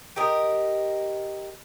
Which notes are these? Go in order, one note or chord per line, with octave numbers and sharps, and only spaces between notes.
G4 A#4 D#5